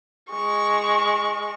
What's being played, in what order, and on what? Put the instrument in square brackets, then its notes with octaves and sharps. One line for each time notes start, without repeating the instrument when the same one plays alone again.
[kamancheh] G#3 C#6